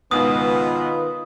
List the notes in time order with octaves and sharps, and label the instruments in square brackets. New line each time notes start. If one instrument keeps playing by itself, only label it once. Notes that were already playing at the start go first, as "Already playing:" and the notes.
[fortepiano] C#2 G#2 B2 [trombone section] D#3 F4 B4 [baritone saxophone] B3 [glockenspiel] D#6